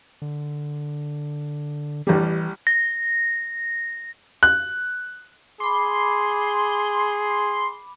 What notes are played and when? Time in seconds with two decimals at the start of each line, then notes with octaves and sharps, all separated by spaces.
0.22 D3
2.07 A1 E3 G3
2.67 A#6
4.43 F#6
5.60 G#4 B5 C6 D6